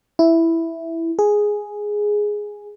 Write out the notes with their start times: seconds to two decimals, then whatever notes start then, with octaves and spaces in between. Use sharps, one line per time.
0.19 E4
1.19 G#4